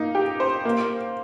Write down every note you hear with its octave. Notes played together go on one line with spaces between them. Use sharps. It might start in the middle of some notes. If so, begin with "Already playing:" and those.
Already playing: A#3 D#4
G4
C5
A#3